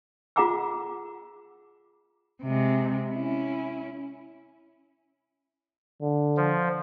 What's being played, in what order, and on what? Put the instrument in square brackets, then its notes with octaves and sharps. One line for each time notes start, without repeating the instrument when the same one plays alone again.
[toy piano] F4 G#4 F#5 A#5 D6 E6
[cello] C3 G#3
C#4 E4
[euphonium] D3
[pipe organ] F3